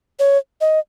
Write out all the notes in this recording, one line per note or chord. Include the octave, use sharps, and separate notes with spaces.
C#5
D#5